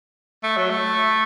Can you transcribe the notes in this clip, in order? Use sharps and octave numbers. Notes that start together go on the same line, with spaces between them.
A3
F#3
A3